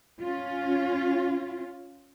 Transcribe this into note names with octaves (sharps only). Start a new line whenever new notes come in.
C#4 F4